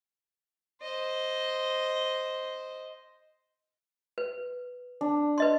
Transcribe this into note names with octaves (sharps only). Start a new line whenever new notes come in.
C5 D#5
B4
D4
B4 D#5 C6